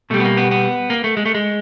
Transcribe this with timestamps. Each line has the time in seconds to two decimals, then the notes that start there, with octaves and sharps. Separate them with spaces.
0.10 B2 G3 A3
0.20 B3
0.25 A#3
0.37 B3
0.51 B3
0.90 A#3
1.04 A3
1.17 G#3
1.26 A3
1.35 G#3